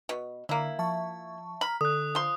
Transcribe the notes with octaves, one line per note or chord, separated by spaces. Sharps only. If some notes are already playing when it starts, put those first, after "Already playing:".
B2
D3 A#3 E4
F3 E5 A5 C#6
A#5 B5 F6
D3 A4 D#6 F#6
F3 C6